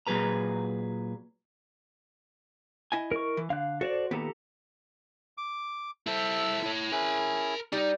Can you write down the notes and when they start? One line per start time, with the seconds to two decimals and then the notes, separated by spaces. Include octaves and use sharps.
0.07 A#2 F#3 G#4 B4 A#5
2.92 E4 D#5 G#5
3.12 A#4 C#6
3.37 E3
3.50 D3 F5 F#6
3.81 F#4 A4 C5 D5
4.11 D#2 A#2 B3 G4 A4 A#5
5.38 D6
6.07 E4 A4 C5 E5 E6
6.63 E4 C#5
6.92 C#4 E4 G#4 A#4 B5
7.73 G3 D#4